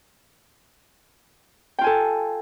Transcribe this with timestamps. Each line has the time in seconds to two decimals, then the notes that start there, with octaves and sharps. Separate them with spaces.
1.79 G5
1.81 F4
1.84 G#5
1.86 A4